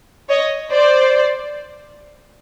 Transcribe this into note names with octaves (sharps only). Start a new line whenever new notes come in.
C#5 D#5
C5 D5